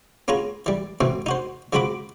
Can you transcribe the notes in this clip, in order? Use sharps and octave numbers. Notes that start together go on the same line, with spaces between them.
B3 C#4 F4 G#4 A#5
E3 G3
B2 E3 A3 C4
D#4 F#4 C5
F3 G#3 C4 F#4 B5 D6